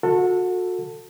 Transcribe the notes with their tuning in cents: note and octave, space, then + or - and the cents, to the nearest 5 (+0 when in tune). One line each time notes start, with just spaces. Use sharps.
F#4 -25 A4 +15